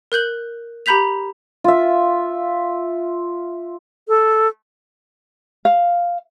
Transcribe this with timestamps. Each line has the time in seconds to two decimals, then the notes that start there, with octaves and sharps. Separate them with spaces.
0.12 A#4 F#6 G6 F#7
0.86 G4 A#5 B5 G6 B6 F7
1.64 F4 E5
4.08 A4
5.65 F5